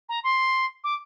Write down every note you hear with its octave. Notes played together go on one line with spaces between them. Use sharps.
A#5
C6
D6